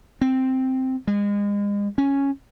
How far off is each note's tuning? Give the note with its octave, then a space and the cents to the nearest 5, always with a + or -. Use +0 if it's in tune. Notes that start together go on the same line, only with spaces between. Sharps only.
C4 +0
G#3 -35
C#4 +0